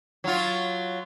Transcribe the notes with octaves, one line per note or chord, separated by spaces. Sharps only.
F#3 F4